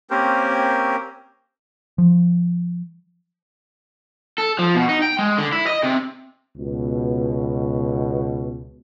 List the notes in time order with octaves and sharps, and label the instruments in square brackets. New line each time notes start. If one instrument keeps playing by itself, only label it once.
[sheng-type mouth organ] A#3 C4 C#4 G4 A#4 C5
[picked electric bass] F3
[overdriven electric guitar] A4
F3
B2
D#4
G5
G#3
D3
E4
D#5
C3
[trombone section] C#2 B2